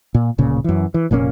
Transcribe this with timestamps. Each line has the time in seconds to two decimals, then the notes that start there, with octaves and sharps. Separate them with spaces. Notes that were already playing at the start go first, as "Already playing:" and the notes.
0.15 A#2
0.38 D1 A#2 C#3
0.64 F#2 E3
0.94 E3
1.11 F1 A#2 A#3 C#4